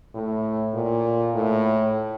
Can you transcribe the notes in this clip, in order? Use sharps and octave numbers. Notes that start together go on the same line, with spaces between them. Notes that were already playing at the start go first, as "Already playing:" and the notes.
A2
A#2
A2